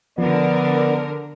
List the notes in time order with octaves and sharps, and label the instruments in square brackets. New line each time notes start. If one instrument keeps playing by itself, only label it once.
[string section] D3 A#4 [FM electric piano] F3 [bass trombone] B3 [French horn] D5